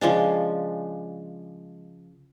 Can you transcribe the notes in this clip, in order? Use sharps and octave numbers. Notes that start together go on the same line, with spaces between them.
C#3 F3 G#3 D4